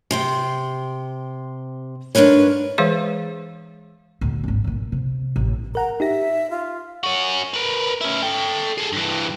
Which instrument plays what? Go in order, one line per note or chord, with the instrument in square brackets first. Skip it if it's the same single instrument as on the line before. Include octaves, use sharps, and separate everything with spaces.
[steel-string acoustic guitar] C3 C5 G5
G#2 D4 A#4 B4 C#5
[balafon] E3 G#3 G#4 B4 C#5 F5
[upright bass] D2 A#2
G#1 C#4
B1 A#2
C3
A1
[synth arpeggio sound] A#4 F#5 [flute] A#5
[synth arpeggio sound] D#4 G4 A#6 [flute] E5
[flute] F4
[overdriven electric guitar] C#4 F#4
A#4 B4
C#4 E4
A4 G5
G#4 A4
G2 E3